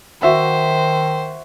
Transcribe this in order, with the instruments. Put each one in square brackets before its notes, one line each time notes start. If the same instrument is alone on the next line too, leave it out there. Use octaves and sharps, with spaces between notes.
[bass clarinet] D#3 [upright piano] F#4 E5 F#5 [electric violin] C5